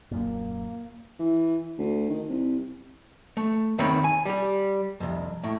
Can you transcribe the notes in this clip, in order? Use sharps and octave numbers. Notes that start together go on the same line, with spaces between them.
D#1 F#2 A#2 A#3
E3
D2
D#3
C2
A3
E2 D#3 C4 C#5 B5
G#5
G3 G4
C2 F2
A2 A3